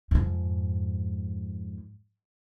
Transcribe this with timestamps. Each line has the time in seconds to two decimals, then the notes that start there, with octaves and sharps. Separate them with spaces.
0.11 F2 G#2